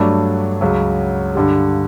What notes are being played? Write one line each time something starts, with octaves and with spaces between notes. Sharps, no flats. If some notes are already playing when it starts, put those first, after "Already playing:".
Already playing: G2 F#3 A3 D4
C#2 C#3 F#3
G2 D3 G3